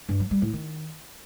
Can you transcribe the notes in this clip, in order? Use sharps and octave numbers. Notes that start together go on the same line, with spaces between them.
G2
F#3
G3
A2
D#3